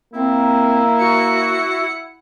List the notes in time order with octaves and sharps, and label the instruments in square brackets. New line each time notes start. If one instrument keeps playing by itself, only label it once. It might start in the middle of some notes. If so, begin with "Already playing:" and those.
[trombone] A#3 [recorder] C4 [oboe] E4
[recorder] F#4 [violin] F#5 C#7